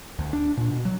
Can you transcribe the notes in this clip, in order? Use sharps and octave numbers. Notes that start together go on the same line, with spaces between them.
D2
D4
A#2
B2
F#3